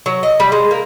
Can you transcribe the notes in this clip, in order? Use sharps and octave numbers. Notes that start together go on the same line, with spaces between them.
F#3
D#5
G3
G#3
A#3